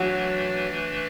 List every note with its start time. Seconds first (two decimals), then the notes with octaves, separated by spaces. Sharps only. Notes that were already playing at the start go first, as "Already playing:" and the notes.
Already playing: E3 F#3 A3 D4 B4